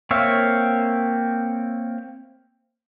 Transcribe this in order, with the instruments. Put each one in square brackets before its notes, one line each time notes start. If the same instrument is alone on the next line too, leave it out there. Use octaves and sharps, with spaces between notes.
[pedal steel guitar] A#3 C4 C#5 E5 F5